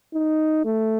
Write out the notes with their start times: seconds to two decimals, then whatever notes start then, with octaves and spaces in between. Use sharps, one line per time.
0.14 D#4
0.65 A3